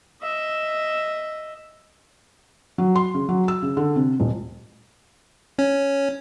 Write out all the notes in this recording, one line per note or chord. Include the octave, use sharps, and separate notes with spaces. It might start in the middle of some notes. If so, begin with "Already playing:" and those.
D#5 E5
F#3
C6
C#3
F#3
E6
C#3
D3
C3
D#1
C#4